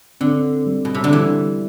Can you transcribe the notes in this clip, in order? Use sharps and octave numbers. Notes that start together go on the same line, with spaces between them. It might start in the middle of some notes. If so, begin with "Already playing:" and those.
D3 C4
G3
B2
C3
D3
E3 G3